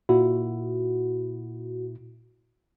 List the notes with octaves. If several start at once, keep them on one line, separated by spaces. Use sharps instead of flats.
A#2 E4 F#4